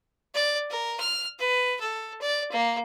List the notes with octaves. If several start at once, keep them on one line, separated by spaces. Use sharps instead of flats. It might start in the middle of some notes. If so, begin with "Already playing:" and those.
D5
A#4
F6
B4
A4
D5
A#3